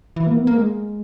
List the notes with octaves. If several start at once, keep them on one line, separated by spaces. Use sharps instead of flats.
E3
A#3
B3
A#3
G#3